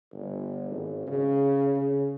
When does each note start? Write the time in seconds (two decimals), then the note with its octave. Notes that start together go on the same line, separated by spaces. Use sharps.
0.13 G1
0.70 G#1
1.07 C#3
1.76 C#3